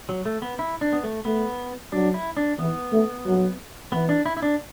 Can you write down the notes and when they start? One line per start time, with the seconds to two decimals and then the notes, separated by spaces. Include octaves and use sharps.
0.09 F#3
0.25 A3
0.42 B3
0.59 E4
0.81 D4
0.93 B3
1.03 A3
1.25 A3 B3
1.92 F#3 D4
2.14 E4
2.37 D4
2.59 E3 B3
2.92 A3
3.26 F#3
3.92 E3 B3
4.09 D4
4.26 E4
4.37 E4
4.42 D4